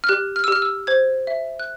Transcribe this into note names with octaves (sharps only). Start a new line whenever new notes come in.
F6
G4 F#6
F6
E6
G4 F6
E6
C5 G#6
E5
F#6